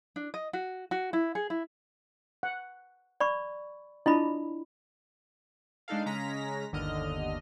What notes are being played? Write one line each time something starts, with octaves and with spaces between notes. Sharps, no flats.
D4
D#5
F#4
F#4
E4
G#4
E4
F#5
D5 B5 C#6
D4 E4 F4 D#5 B5
G#3 D4 D#4 A4 F5
C#3 G#3 C#4 A#5 A#6 B6
G1 D#2 D3 D#5 F6